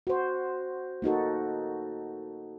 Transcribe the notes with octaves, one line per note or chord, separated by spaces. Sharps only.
F#4 C5
A#3 D#4 F#4 A4